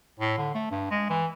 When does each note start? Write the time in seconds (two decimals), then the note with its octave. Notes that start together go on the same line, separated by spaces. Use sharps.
0.20 A2
0.37 D3
0.54 A3
0.71 G2
0.90 G#3
1.10 E3